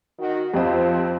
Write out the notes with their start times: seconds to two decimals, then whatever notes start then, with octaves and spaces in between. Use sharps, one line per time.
0.19 D#3 F#4
0.54 F2 F3 C4 G4 D#5 F5